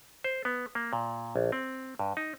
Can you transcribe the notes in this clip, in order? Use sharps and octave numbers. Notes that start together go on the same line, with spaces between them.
C5
B3
A#3
A#2
A#1
C4
G2
D#4